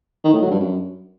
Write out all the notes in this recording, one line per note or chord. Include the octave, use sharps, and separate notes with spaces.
D#3
A2
F#3
G2
F#2